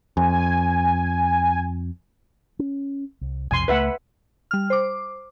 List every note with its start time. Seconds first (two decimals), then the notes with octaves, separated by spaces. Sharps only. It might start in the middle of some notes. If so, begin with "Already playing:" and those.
0.17 F2 G#5
2.59 C#4
3.21 C2
3.51 B1 F2 C3 G#5 C6
3.68 C#2 F#3 A3 B4 E5 F#5
4.51 G3 F6
4.70 C5 D6